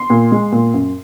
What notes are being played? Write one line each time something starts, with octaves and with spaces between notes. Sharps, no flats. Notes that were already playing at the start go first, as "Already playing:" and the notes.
Already playing: C6
A#2
G#3
A#2
F#2